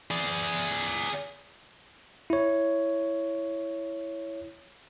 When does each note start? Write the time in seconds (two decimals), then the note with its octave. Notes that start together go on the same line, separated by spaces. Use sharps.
0.11 G#4 D5
2.30 E4 C#5